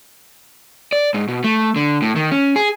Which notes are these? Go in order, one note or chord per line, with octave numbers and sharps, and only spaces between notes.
D5
G#2
B2
A3
D3
A2
D#3
C#4
G#4